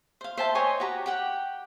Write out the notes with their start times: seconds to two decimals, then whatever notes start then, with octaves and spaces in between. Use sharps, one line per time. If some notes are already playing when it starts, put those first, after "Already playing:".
0.21 C5 F5
0.37 C5 E5 G5 A5
0.55 C5 C#5 D#5 G#5
0.80 F#4 G4 A#5
1.06 G4 F#5 G5